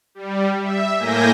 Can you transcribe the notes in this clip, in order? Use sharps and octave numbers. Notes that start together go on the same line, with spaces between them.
G3
E5
A2 A#3 G#5 G6 A#6